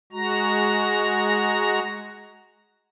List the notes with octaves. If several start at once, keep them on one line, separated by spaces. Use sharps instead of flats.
G#3 F#4 A#5